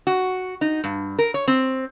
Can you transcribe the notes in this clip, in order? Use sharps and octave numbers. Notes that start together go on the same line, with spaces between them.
F#4
D#4
G2
A#4
C#5
C4